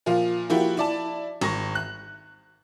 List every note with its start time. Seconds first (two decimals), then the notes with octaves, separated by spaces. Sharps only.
0.06 A#2 F3 F4
0.50 F3 A#3 E4 F#4 G4
0.77 E4 D5 A5
1.41 G#1 C#6 A#6
1.75 F#6